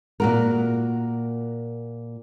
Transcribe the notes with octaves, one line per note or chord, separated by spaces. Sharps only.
A#2 F#4 A#4